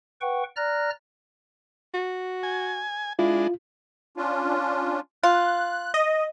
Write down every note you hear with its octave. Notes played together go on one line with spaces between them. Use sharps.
B4 F#5 G5 C#6
D5 A#5 F6 F#6 A#6
F#4
G#5
G#3 D4 E4 F4
C#4 D4 F4
F4 F#6
D#5